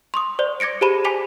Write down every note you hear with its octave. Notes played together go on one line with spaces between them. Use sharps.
C6 C#6 D#6
C5 D5 F7
D6 G#6 A#6 C#7 D7
G4 G#4 C5 A5 B5 D#7
G#5 A5 D6 B6 D#7 F7